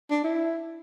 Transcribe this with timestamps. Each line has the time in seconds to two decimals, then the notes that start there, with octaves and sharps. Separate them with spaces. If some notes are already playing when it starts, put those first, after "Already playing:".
0.11 D4
0.24 E4